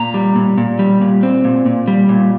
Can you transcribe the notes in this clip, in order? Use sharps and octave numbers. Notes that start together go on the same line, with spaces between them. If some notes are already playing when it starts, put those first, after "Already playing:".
Already playing: A#2 A#5
G3
A#2
A#2
G3
A#2
C4
A#2
A#2
G3
A#2